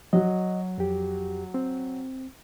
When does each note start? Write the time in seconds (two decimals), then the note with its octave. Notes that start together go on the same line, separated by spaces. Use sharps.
0.13 F#3 F#4 D#5
0.78 F2 G4
1.54 C4